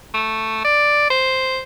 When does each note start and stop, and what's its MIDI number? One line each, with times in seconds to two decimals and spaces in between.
0.14 0.63 57
0.64 1.09 74
1.10 1.61 72